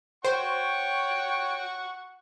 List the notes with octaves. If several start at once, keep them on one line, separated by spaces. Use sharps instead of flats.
C5 C#5 F#5 G5 C#6